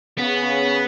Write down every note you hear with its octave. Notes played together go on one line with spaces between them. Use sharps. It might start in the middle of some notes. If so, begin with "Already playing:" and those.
C#3 B3